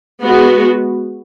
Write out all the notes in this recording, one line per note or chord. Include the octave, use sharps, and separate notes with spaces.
G#3 B3 F#4